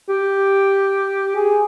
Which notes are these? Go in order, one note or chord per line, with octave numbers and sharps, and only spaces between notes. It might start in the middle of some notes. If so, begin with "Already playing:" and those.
G4
G#4